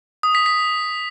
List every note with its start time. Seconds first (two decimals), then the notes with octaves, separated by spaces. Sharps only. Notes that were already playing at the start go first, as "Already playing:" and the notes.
0.23 D#6
0.35 B6
0.46 B6